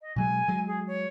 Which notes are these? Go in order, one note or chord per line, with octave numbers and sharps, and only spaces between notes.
D#5
B2 F#3 G#3 G#5
F#3 G#3
G#4
C#5